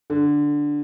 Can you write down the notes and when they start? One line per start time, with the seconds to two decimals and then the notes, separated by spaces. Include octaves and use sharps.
0.10 D3